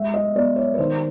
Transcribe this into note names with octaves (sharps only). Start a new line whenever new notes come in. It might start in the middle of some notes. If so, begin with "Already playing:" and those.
Already playing: G#3 E5
D#5
B3 D5
C#5
B4
D#3 C5